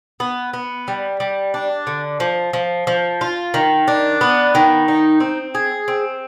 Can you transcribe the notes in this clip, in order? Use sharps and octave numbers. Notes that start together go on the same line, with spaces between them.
B3
B3
G3
G3
D4
D3
F3
F3
F3
F4
D#3
D4
B3
D#3
D#4
C4
G#4
C4